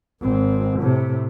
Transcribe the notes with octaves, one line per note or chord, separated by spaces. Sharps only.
G#1 C4
A2 C3